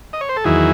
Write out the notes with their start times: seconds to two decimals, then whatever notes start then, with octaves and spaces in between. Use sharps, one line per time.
0.13 D#5
0.21 C#5
0.29 C5
0.36 A4
0.44 E2 D#3 F#3 E4 G#4